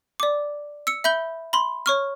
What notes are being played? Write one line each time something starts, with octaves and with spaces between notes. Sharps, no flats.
D5 D6
E6 C#7
E5 B5 G6 G7
B5 C6
C#5 C#6 F6